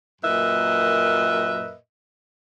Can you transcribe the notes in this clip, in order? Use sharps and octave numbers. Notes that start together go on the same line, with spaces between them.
F#2 A#2 A#4 B4 D#5 E5